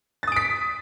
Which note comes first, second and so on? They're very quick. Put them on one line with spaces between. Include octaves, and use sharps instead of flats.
A6 D#6 D7 B6